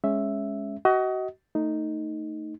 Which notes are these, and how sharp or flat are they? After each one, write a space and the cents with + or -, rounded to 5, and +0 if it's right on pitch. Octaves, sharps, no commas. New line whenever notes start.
G#3 +0 C#4 +0 E5 +0
F#4 +30 D#5 +25
A3 +20 D#4 +0